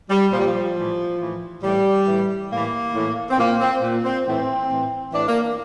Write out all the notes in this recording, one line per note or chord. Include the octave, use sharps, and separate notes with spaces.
G3
A#2 F3
G3
F3
A2 E3
A2 E3
A2 E3 G3
A2 E3
A2 E3 A#3
A2 E3
C4
A#2 A#3
C4
A#2
C4
A2 E3 C4
A2 E3
A2 E3 D4
A#3